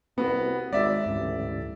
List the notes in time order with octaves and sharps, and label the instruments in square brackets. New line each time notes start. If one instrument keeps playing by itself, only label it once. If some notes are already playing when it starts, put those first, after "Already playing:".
[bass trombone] C2 [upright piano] B3 F#4 [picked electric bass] C4
[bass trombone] G#1 [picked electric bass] G#3 [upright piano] D5 E5
[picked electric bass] D1 G#2 [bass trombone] A1